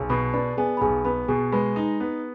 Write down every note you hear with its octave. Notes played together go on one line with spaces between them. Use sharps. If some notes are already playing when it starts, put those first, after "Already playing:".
Already playing: B1 G#4 G#5
B2 B4 B5
D4 B4 B5
B3 G#4 G#5
B5
B1 G#4 G#5
B3 B4 B5
B2 G#4 G#5
G#3 B4 B5
D#4
B3